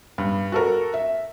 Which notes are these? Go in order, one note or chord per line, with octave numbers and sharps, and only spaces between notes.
G2
F#4 A4 A#4
E5